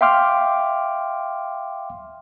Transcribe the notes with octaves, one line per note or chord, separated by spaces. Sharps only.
E5 F5 G5 C6 D6 F6